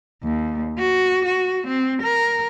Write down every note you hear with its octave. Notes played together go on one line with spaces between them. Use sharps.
D#2
F#4
F#4
C4
A#4